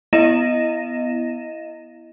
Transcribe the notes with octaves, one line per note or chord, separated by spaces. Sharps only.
B3 E4 D#5 A#6 D#7 E7